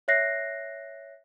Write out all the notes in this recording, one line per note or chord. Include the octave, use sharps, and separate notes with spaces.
C#5 E5 F#6 A#6 C7